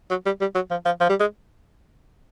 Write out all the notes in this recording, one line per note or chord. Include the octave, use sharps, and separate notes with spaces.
F#3
G3
G3
F#3
F3
F3
F3
G3
G#3